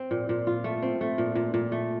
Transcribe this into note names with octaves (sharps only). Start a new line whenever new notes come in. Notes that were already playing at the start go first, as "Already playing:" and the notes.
Already playing: C4
A#2
A#2
F4
A3
C4
A3
A#2
A#2
A#2
A3